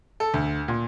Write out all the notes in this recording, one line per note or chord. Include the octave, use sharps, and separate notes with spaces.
A4
D2
A#2